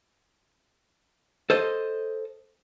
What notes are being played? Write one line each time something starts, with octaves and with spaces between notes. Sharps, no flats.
A4 C5 D#5